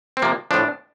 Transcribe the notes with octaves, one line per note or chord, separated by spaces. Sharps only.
C4
C3 F3 A#3
A2 F3 D4